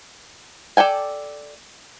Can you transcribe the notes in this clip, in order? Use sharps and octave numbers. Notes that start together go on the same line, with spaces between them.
A4 D5 G5 G#5